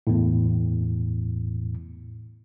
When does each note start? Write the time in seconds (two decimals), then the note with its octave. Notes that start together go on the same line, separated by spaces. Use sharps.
0.07 E2 A2